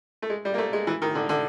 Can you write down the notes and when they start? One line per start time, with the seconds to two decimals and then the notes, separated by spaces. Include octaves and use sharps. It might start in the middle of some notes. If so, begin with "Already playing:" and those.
0.22 A3
0.30 G#3
0.45 G3
0.54 A#3
0.58 A3
0.73 G#3
0.87 E3
1.02 D#3
1.15 D3
1.29 D3